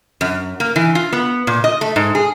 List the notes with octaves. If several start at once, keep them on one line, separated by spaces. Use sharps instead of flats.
F#2
A#3
E3
F4
B3
A#2
D#5
A3
G#2
G#4